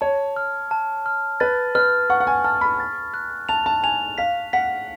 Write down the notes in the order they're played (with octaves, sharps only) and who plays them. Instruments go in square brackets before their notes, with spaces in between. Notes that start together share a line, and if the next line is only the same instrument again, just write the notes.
[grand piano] C#5 [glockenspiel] A5
[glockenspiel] F6
A5
F6
[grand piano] B4 [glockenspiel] A6
[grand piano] B4 [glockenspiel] F6
[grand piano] F#5 [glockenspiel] C#6
[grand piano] F#5
G#5
[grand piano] A5 [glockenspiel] F6
[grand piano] B5
[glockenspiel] A6
F#6
[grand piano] A5 [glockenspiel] F7
[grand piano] A5
[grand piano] G#5 [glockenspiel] F7
[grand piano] F5 [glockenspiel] B6
[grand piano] F#5 [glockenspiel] B6